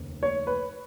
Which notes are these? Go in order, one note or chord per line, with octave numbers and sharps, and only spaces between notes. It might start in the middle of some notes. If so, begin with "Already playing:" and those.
Already playing: F1 D#2 C#3
C#5
B4